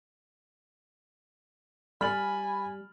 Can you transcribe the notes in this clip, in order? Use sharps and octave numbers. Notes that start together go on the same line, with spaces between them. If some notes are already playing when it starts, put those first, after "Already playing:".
G3 G#5 B5 F6 A6 F#7